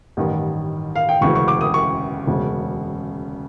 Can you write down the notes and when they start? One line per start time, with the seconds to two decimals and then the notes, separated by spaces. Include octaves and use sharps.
0.17 A1 G2 D#3
0.96 F5
1.09 G5
1.21 E1 D2 C#3 E3 C#6
1.35 C#6
1.48 D6
1.61 D#6
1.74 C#6
2.27 E1 D2 C#3